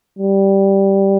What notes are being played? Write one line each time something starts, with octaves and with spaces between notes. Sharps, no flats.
G3